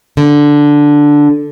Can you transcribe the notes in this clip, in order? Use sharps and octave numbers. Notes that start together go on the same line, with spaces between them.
D3